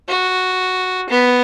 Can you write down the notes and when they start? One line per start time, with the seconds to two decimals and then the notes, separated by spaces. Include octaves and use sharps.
0.09 F#4
1.10 B3